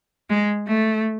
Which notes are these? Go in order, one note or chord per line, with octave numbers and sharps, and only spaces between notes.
G#3
A3